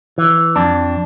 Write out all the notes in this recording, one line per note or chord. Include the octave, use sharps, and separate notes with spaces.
E3
F2 D4